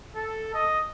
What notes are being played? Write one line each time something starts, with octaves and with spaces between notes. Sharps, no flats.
A4
D#5